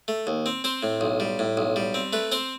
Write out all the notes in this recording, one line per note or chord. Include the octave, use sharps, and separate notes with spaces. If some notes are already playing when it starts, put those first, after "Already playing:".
A3
D#2
C4
C4 C5
A2
B1
G3
A2
B1
G3
C4
A3 B4
C4 C5